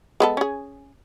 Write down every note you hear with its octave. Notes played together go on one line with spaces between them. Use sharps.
G#3 B3 A4
C#4 G#4